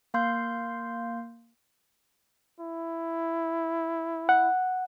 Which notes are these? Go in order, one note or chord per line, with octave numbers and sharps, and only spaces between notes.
A#3 F5 C6 G6
E4
F#5